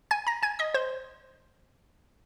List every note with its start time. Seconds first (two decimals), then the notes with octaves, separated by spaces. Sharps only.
0.11 G#5 G#6
0.27 A#5 A#6
0.43 G#5 G#6
0.59 D#5 D#6
0.74 C5 C6